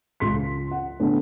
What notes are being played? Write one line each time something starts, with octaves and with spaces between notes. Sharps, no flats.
C#2 C6 B6
F#5
D3 A3 B3